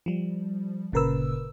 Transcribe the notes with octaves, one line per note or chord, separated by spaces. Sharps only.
F3 G3
G1 A#2 C#3 A#4 B4 E6